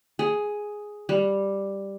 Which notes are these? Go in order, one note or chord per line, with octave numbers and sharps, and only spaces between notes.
G#4
G3